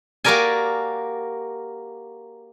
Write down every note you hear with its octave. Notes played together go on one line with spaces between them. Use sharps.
A#3 F#4 G4 A#4 D5 G#5